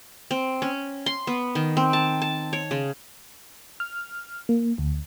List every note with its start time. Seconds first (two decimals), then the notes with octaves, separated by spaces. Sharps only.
0.31 C4
0.62 C#4
1.06 C6
1.27 B3
1.55 D#3
1.77 C4
1.93 A5
2.22 A5
2.53 C#5
2.71 C#3
3.80 F6
4.49 A#3
4.78 D2